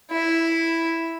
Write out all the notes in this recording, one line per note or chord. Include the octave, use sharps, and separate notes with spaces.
E4